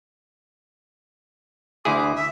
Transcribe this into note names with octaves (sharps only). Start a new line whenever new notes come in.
D2 E4 G#4 D6
E5